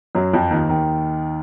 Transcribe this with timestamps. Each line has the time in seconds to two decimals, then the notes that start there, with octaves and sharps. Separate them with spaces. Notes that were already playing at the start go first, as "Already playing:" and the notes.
0.15 F#2 F#3
0.33 F2 F3
0.51 D#2 D#3
0.69 D#2 D#3